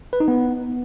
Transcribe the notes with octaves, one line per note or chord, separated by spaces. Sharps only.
B4
D#4
B3